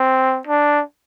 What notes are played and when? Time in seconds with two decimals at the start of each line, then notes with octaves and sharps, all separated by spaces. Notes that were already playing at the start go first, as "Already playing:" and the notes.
Already playing: C4
0.47 D4